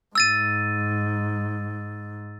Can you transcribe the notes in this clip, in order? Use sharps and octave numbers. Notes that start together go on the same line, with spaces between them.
G#2 E6 A6 D#7